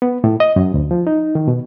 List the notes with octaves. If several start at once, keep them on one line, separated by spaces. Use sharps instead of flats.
B3
A2
D#5
F#2
D2
F3
D#4
D#3
B2